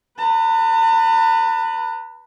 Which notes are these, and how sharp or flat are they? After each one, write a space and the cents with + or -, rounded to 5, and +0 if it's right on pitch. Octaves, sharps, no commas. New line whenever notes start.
B4 -5 A5 +45